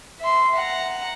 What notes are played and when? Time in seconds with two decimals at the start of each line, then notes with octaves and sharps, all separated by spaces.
0.20 E5 C6
0.55 F#5 A#5